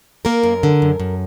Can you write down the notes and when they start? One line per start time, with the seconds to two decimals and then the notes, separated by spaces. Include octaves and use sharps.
0.25 A#3 A#4
0.43 F#2
0.63 D3
0.82 F#2
1.00 F#2